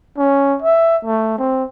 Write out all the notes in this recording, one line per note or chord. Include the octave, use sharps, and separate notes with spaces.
C#4
E5
A3
C4